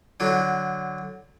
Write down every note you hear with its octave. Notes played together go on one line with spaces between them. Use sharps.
D3 F#3